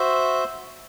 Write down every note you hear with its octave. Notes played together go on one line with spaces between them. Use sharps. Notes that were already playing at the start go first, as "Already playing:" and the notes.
Already playing: F#4 C5 E5